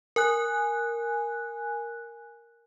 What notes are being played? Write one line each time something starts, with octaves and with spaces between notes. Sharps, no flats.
A#4 G#5 F#6